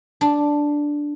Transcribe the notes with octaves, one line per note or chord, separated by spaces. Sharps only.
D4 A5